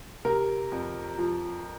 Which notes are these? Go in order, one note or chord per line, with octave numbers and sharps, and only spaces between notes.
C3 A#4
F2
F3